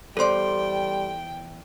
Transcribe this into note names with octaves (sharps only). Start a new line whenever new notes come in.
E2 G3 A4 C5 D5 G5 C6